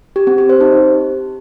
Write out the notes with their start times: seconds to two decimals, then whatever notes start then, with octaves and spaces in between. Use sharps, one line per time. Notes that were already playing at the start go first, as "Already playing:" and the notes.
0.16 G4
0.27 C4
0.38 G4
0.49 C5
0.61 D#4